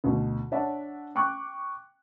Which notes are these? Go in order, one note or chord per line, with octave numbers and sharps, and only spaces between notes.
D2 B2
D4 C#5 D5 E5 F#5 A5
G5 C#6 D6 F#6